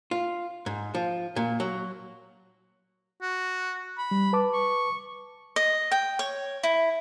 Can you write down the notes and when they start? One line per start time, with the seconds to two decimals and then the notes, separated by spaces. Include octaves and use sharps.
0.11 F4
0.66 G#2
0.95 F3
1.36 A#2
1.60 F#3
3.22 F#4
3.98 B5
4.11 G3
4.33 B4 A5 D6
4.53 C#6
5.56 D#5
5.91 G5
6.19 C#5
6.63 E4